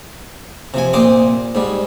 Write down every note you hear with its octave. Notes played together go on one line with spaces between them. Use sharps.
C3 F3 G#5
A#2 C4 C5 D6 D#6
G#2 G3